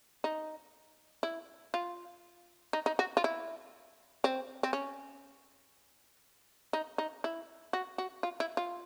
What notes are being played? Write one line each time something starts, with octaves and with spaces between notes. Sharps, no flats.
D#4
E4
F4
D#4
D#4
F#4
F4
E4
C4
C4
C#4
D#4
D#4
E4
F#4
F#4
F4
E4
F4